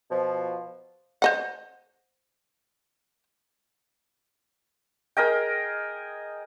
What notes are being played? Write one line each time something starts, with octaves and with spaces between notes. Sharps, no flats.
B2 F3
C5 D#5 F#5
G#4 A#4 D#5 G5